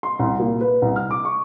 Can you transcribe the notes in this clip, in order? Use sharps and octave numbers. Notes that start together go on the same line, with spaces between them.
C6
C2
A#2
B4
C2
F6
D6
C#6